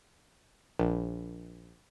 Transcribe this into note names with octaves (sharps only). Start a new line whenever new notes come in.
A#1